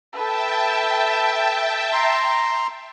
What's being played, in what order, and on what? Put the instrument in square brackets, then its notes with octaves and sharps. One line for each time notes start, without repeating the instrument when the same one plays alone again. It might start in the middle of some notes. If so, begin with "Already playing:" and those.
[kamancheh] A4 B4 [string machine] E5 G5 A5
[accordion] A#5 C6